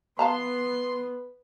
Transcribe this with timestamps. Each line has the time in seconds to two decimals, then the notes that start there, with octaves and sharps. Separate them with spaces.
0.19 B3 B4 F5 A5 A#5 C6